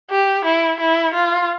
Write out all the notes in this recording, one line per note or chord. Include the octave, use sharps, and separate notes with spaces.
G4
E4
E4
F4